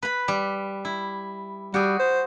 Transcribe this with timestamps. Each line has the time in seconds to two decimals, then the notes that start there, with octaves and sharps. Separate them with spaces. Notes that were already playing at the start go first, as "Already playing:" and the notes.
0.03 B4 B5
0.28 G3
0.85 E4
1.74 G3 F#4 G#4
1.99 C5